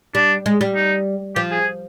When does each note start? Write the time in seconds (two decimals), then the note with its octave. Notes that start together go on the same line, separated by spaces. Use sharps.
0.15 G3 D4
0.46 G#3
0.61 G3
0.75 D#4
1.36 F3 G4
1.51 G#4